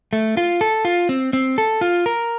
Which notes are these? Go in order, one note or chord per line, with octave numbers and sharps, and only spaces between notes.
A3
F4
A4
F4
C4
C4
A4
F4
A#4